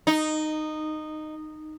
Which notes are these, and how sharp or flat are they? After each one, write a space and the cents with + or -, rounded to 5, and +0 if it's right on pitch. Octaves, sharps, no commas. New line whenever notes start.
D#4 -15